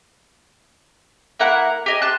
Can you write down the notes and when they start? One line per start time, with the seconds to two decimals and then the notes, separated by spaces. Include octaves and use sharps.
1.39 A#3 E4 A#4 F#5
1.86 G4 D#5 G#5
2.02 A5 C6 F#6